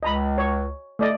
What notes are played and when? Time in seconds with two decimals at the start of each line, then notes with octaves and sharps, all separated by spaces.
0.03 C#2 D#5 A#5 B5
0.38 C#5
0.99 A3 D5 D#5